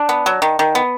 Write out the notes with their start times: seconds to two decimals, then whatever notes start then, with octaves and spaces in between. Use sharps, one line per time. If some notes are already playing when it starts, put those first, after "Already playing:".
Already playing: D4
0.09 B3
0.26 F#3
0.42 D#3
0.59 D#3
0.75 B3